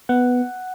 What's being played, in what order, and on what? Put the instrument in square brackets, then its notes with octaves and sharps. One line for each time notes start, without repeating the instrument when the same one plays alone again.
[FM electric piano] B3 F#5